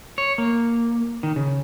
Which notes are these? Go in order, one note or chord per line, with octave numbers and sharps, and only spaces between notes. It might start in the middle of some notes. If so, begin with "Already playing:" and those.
C#5
A#3
D#3
C#3